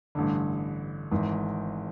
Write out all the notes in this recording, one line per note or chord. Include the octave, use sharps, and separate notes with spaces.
A1 G2 D3
G#1 G#2 E3